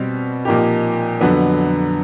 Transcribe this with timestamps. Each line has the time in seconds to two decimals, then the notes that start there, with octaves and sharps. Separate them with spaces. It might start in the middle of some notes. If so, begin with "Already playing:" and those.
Already playing: B2 G3 C4
0.45 A#2 F3 A#3 D#4 G4
1.21 F2 D3 F#3 B3